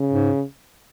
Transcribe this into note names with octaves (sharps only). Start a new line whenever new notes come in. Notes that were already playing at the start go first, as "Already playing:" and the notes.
Already playing: C#3
G#2